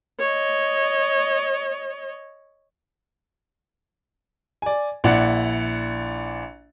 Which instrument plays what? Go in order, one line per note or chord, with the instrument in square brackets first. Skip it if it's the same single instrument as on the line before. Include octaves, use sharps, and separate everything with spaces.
[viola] C#5 D#5
[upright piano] D5 G#5
A#1 E4 D5 F#5